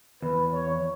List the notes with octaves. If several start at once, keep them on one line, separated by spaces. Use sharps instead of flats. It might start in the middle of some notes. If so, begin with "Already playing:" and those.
E2 B4
C#5